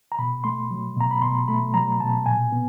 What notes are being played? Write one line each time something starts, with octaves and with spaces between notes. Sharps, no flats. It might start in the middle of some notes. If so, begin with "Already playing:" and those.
A#5
B2 B5
A3 C6
F#3
B2 A#5
B5
B2 C6
A3 B5
F#3 A#5
B2 A5
A#2 G#5
B3